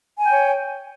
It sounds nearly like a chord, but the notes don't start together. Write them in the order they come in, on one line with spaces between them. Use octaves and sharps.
G#5 G5 C#5